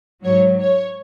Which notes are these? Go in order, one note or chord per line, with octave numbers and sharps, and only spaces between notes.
G#2 F#3 C#5
C#5